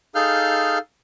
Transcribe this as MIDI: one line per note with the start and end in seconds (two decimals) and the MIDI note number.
0.15 0.78 63
0.15 0.78 68
0.15 0.78 69
0.15 0.78 77
0.15 0.78 89
0.15 0.78 91